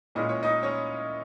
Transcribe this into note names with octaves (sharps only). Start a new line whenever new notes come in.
A#2 G#3 C#4 E4 D#5
C#5
D#4 D#5
C#4 C#5